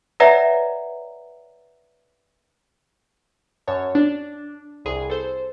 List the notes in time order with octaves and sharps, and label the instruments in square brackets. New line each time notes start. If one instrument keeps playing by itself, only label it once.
[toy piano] B4 C#5 D5 E5 F#5 A#5
[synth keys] F#2 C#5 A5
D4
C2 G#4
A4 C5